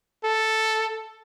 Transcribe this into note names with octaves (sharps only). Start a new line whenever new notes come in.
A4